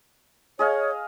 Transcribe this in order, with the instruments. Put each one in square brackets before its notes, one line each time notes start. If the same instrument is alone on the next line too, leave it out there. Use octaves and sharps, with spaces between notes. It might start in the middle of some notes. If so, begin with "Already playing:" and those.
[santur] G#4 D#5 F5 [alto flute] C#5